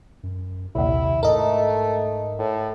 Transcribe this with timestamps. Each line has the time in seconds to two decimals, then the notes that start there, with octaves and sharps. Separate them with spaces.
0.23 F#2
0.75 A#1 D#2 C3 E4
1.23 G#2 A3 A#4 D#5
2.39 A2